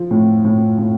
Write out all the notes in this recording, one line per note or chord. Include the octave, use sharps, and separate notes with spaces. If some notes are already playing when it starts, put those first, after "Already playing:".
Already playing: F3
A2
A2
A2